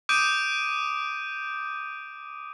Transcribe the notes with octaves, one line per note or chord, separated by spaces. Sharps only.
D6 D#6 G6 D7 D#7